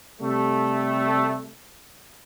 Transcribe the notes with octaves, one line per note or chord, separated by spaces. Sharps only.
C3 G3 A3